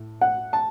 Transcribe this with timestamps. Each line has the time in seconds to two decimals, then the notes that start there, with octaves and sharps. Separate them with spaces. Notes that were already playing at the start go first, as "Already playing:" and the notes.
Already playing: A2
0.21 F#5
0.53 A5